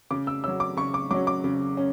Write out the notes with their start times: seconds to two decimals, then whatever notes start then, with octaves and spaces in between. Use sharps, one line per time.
0.11 C#3 D6
0.27 E6
0.44 F#3 C#4 E6
0.60 D6
0.77 C#3 C#6
0.94 D6
1.11 F#3 C#4 D6
1.27 D6
1.44 C#3
1.77 C#4